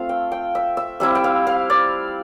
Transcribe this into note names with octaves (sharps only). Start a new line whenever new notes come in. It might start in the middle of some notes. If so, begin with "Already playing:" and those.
Already playing: A3 C4 F4 F5
G5
G5
E5
E5
G3 C4 E4 E5
G5
F5
F5
D5